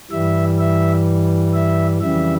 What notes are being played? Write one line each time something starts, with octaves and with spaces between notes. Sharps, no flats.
G2 E3 G3 E5
E5
E5
F2 C#3 E3 G3 E5